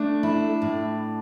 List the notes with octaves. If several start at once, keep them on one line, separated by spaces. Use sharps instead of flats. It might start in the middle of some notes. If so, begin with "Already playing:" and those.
Already playing: A3 D4
E4
A2